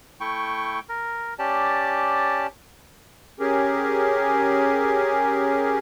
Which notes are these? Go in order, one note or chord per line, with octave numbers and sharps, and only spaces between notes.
A3 E4 G5 C#6
A#4
C#4 G4 D5 A5
C#4 G4 G#4 A#4